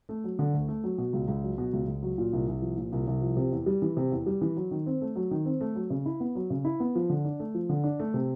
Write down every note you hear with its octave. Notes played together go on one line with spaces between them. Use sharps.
A3
F#3
D3
D2
A3
F#3
B2
C#2
C#2
F#3
B2
C#2
C#2
F#3
A#2
C2
C2
F3
A#2
C2
C2
F3
C3
E2
G3
E3
C3
E2
G3
E3
F#3
D#3
C4
A3
F#3
D#3
C4
A3
F#3
C#3
E4
B3
F#3
C#3
E4
B3
F3
D3
D4
A3
F3
D3
D4
A3
C3